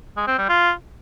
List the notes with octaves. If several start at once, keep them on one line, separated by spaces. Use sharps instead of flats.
G#3
C4
G3
F4